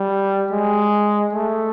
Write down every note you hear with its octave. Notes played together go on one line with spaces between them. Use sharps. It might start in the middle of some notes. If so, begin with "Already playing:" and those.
Already playing: G3
G#3
A3